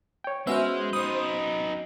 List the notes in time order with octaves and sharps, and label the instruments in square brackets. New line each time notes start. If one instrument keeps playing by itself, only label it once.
[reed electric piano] C#5 G5
[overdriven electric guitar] G#3 [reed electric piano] B3 C#4 F#4 [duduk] C5 [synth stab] E5 F6
[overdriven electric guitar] D#4 B4 [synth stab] D#6